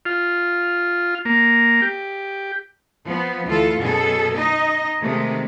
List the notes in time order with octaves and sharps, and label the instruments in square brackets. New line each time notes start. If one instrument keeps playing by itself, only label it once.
[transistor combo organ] F4
A#3
G4
[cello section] F3 B3
D2 E3 F4 A4
F#2 B2 G#4 A4
D#4 D#5
C3 D#3 G#3 A3